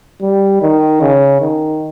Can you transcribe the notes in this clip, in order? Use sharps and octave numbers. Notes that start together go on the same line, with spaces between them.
G3
D#3
C#3
D#3